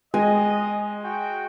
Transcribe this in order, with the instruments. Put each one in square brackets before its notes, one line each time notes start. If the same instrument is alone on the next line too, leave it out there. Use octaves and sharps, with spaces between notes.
[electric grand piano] G#3 [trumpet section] D#5 [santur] G#5
[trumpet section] F#4 G5